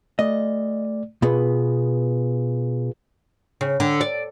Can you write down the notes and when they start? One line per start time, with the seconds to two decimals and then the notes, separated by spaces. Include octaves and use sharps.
0.19 A3 D5 D#5
1.22 B2 B3 F4 G#4 B4
3.61 C#3
3.80 D3
4.01 D5